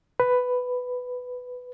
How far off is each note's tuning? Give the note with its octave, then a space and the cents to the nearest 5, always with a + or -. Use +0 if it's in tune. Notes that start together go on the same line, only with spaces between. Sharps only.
B4 +10